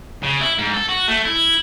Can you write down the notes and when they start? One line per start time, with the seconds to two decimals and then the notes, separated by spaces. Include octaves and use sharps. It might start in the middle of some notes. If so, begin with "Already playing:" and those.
0.23 C#3
0.41 E4
0.58 G#2
0.74 A4
0.89 F#4
1.08 A3
1.24 E4